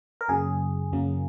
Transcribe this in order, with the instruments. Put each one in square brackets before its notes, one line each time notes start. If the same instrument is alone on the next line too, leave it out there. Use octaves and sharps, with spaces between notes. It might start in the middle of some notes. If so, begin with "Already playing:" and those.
[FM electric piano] A#4
F#2 C#3 F#3 A#3 G#4
F#2 C#3 F#3 A#3